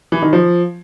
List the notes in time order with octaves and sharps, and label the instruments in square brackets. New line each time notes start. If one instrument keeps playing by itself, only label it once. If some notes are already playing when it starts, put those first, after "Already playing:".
[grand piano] E3
D#3
F3